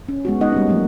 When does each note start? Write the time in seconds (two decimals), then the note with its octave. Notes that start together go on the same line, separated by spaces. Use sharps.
0.09 C#4
0.25 G#3 B3 F#4
0.41 G#3 B3 D#4 D#5 F#5
0.52 G3 A#3 C#4
0.69 F3 F#3 A3 A#3